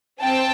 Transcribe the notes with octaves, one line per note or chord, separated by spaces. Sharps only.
C4 G5 A5